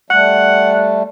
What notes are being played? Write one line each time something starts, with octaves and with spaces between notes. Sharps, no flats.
G3 A3 F#5